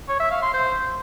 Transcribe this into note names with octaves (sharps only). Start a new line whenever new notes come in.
C#5
E5
F5
C6
C5